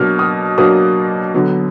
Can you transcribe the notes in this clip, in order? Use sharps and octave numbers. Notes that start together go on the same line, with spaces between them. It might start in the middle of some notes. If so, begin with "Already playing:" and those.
Already playing: B2 F#3 A#3 D4 F6
D#6
B2 F#3 A#3 D4 D#6
D3 F#3 B3